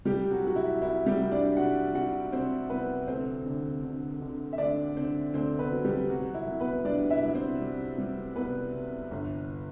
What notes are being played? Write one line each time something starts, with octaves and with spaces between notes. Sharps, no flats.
C2 G3 G4
F#3 F#4
C2 F#4
E4
C2 E4
G3 G4
C2
D4 D5
C2 F#4 F#5
C3 F#4 F#5
C3 C4 C5
C2 B3 B4
D2 C4 C5
D3
D3
D3
E5
D2 D4 D5
D3 C4 C5
D2 C4 C5
B3 B4
F#3
G3 G4
C3 F#3 F#4
E4
C2
B3 B4
G3 D4 D5
E4 E5
C2
C4 C5
G3
G3
C2 B3 B4
C3
G1